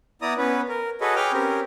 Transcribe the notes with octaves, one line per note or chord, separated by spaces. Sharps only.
B3 E4 D5 A#5 D#6
B3 C#4 B4
A#4
F#4 G#4 A4 B4 C#5 D#5
G#4 B4 C#5 G5 D6 F6
C4 C#4 G4 A#4